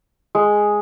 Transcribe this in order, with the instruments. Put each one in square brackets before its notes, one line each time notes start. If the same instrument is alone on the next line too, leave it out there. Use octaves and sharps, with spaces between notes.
[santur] G#3